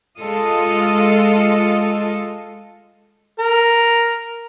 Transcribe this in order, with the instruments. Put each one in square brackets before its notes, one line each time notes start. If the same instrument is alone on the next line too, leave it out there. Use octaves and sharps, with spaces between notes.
[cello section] G#3 F4 A4 D#5
[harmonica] A#4